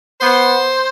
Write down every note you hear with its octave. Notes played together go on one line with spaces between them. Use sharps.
B3 C5